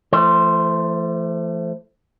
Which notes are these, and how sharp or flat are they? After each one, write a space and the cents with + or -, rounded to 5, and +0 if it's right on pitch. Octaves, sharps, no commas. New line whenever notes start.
E3 +45 A3 +0 C5 +0